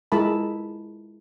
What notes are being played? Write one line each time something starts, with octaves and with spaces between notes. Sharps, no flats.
G#3 E4 F4 A#4 A5 B5